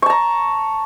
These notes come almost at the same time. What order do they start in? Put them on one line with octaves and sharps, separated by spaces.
C#6 A5 A#5